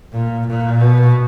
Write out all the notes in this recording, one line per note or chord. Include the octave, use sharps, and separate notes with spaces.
A#2
A#2
B2